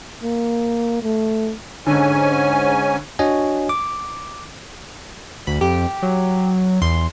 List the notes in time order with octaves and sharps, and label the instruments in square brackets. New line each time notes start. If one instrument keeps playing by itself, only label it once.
[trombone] A#3
A3
[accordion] G#2 C#4 G#5 [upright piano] D3
[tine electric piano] D4 F#4 C#5 D#5 G#5
D6
[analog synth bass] D2 [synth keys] B5
[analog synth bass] F2 [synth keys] G4
[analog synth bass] F#3
[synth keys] E2 C6